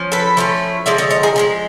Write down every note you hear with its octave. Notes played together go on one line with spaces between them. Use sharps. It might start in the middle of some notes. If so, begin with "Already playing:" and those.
Already playing: F3 C#4
A4 B4
F3 A3 C#4
D3 F3 G#3 D5 E5
C#5 D#5
C#5 D#5
G#4 A#4
D3 F3 G#3